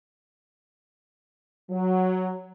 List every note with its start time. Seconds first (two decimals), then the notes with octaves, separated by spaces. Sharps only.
1.71 F#3